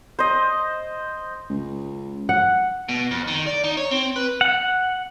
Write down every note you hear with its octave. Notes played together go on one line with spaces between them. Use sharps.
C5 D#5
C#2
F#5
B2
F2
D#3
D5
D#4
C#5
C4
B4
F#5